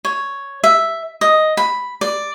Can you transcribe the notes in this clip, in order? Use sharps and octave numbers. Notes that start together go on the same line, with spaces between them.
C#5
E5
D#5
B5
D5